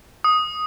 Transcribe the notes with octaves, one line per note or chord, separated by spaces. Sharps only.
D#6